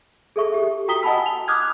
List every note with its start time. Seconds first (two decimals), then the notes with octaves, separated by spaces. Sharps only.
0.36 G#4 A4 E5 C#6
0.54 G4
0.88 F#4 G5 A#5 D#6 B6 G7
1.03 D#5 F#5 G#5 A5 B5 E6
1.26 F7
1.48 D6 D#6 F6 F#6 G#6